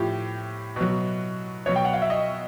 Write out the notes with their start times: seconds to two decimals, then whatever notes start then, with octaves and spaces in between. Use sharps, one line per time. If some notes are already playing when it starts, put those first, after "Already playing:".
Already playing: A2 F3 G4
0.76 B2 F#3
1.66 B2 F#3 C#5
1.76 G5
1.85 F#5
1.93 F5
2.02 E5
2.10 D#5